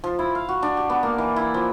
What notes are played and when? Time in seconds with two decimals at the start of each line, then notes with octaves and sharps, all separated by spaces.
0.04 F3
0.19 E4
0.35 F5
0.49 F#4
0.63 D4
0.77 G4
0.90 B3
1.03 A#3
1.18 E3
1.36 E4
1.54 F3